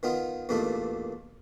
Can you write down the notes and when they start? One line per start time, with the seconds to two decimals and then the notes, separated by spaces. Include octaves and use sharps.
0.03 D#3 B3 D#4 F4
0.49 E2 G2 A#2 A3 D#4